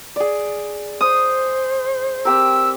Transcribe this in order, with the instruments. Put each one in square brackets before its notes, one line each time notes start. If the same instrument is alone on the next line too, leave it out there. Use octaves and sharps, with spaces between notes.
[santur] G#4 D5
[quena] C5 [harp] D#6
[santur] C4 G4 A#4 [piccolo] E6